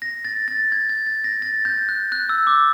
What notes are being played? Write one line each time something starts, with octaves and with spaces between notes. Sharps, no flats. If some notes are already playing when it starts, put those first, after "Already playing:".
A#6
A6
A6
G#6
G#6
A6
A#6
A6
G6
F#6
F#6
E6
D6